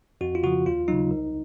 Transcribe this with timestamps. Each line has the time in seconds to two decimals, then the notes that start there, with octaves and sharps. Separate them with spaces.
0.21 F2 F#4
0.35 F4
0.43 C#3 F3 F#4
0.66 D#2 F4
0.88 C#3 F#3 D#4
1.11 C2